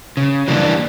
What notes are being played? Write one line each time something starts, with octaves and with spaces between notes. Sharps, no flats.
C#3
E3 G3 A#3 D4